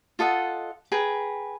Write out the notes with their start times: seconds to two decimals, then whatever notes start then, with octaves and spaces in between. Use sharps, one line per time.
0.19 F4 A4 D#5 F#5
0.92 G#4 B4 G5 A#5